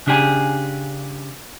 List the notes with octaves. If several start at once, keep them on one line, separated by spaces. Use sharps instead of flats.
C#3 D4 G4 G#4 G#5